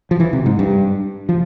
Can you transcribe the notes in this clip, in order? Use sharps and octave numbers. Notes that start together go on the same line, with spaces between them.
F3
E3
C3
G#2
G2
F3